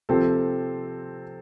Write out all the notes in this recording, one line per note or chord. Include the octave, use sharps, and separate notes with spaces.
C3 F3 C4 A4